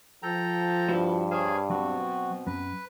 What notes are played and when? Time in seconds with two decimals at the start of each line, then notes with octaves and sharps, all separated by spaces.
0.23 F3 A4 G5 A#5
0.89 G2 E4 F#4 C5
1.31 G#4 C5 C#5 F5 G#5
1.70 B2 F#3 C4 F#4
2.47 F#2 B4